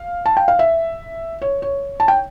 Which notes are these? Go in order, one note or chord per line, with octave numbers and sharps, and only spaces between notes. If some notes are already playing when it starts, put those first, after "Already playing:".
Already playing: F5
A5
G5
F5
E5
C#5
C#5
A5
G5